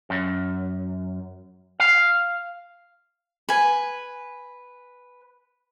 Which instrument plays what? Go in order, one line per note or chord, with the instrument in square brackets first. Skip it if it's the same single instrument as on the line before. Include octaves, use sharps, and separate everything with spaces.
[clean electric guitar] F#2
F5
[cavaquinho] B4 G#5